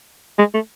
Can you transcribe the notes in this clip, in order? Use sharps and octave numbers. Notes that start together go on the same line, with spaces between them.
G#3
A3